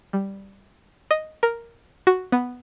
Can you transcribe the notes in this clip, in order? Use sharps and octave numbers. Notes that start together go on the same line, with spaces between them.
G3
D#5
A#4
F#4
B3